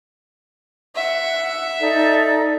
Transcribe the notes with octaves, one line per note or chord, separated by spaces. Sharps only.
E5 F#5
D#4 A4 D5